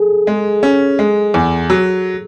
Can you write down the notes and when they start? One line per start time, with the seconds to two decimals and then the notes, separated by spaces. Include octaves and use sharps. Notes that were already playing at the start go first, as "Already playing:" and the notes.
Already playing: G#4 A4
0.27 G#3
0.63 C#4
0.99 G#3
1.34 E2
1.70 F#3